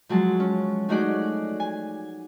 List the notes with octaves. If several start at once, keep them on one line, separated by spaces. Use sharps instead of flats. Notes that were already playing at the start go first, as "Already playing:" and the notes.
F3 F#3 G#3 A5
C#4
A3 C#4 D#4 F#4 G#4 D5
G#5